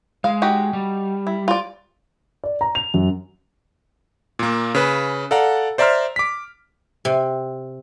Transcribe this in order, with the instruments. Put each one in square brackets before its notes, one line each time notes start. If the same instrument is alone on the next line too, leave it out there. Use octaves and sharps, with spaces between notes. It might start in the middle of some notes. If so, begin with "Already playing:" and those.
[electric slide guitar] G#3 [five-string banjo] F5
[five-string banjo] D#4 F#4 G4
[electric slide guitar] G3
[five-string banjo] E4
F4 D5
[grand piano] D5
A#5
F7
F#2
[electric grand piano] A#2 A#3
C#3 B4
A4 D5 F5 F#5 A#5
C5 D5 E5 A#5 C6 F6
D6 B6
[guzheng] C3